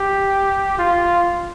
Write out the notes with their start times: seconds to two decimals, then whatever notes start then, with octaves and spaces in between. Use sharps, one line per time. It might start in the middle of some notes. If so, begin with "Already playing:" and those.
Already playing: G4
0.79 F4